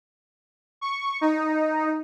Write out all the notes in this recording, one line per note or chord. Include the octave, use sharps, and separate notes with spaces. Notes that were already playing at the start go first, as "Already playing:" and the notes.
C#6
D#4